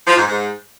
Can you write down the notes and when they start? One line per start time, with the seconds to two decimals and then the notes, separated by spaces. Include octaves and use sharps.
0.07 F3
0.17 G#2
0.27 G#2